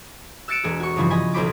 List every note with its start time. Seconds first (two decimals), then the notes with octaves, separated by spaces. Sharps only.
0.48 E6 F#6 A6 C#7 D7 E7
0.64 E1 G#4
0.80 F#4 C#6
0.96 G2 C#3 E3 F3 F#4
1.10 D#5 G#5 B5
1.33 E1 B1 C5 B5 D6